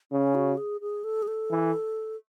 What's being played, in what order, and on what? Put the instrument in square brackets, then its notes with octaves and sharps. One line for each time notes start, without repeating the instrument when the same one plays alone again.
[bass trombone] C#3 [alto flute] C#4
[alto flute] F#4
G#4
G#4
A4
G#4
A4
[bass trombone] E3